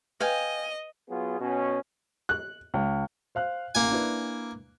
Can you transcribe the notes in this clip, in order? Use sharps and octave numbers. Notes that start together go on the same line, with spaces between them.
B4 D#5 F5 G5 G#5
F#3 B3 F4 G#4
B2 C#4
F#6
C#2
C5 F5 F#6
A1 A#3 F5 G#5
D4 E4 B4